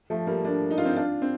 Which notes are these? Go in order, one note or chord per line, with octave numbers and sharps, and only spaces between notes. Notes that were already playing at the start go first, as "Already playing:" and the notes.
F3 A3
G3 A#3
A#3 D4
D#4
F4
C4 D#4
D4 F4
C4